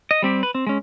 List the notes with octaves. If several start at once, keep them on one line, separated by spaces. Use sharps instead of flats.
D#5
G3 C4 G4
B4
C4
G#3 C#4